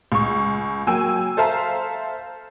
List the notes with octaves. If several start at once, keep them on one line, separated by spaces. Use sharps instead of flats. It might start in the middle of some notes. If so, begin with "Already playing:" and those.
C#2 C#6
F#3 A#3 G5 G#5 E6
A4 C5 E5 F5 A5 A#5